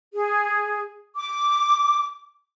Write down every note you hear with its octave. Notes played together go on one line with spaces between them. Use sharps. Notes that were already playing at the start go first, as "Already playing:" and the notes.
G#4
D6